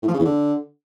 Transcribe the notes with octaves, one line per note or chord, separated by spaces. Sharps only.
A2
F3
C#3
E2
D3